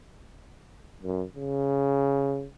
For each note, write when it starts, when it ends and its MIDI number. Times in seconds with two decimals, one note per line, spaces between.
1.03 1.24 42
1.35 2.47 49